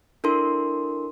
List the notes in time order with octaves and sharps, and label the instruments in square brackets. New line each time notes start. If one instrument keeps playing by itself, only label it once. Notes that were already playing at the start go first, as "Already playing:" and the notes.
[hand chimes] D4 E4 A4 A#4 C6